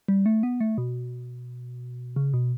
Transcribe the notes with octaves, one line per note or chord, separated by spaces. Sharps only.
G3
A3
B3
A3
B2
C#3
B2